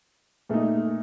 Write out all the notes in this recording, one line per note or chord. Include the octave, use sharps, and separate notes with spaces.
A#2 A3 D#4